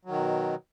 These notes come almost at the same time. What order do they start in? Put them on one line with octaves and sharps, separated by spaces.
F#3 D#3 B2